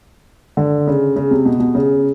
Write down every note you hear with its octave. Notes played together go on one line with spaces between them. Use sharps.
D3
C#3
C#3
C3
B2
B2
C#3